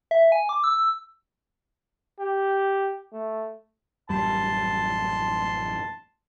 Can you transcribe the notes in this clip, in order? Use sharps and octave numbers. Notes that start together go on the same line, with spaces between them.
E5
G#5
D6
E6
G4
A3
A1 F#2 G3 A5 C6